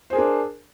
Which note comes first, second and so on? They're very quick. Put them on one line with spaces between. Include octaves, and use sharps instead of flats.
C5 G#4 A#4 D4